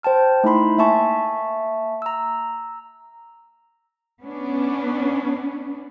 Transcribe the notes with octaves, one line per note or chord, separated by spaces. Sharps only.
C5 G5 A5 F6
A3 D#4 E4 B5 C6
A#3 E5 G#5 A5 C#6
A#5 E6
B3 C#4 D4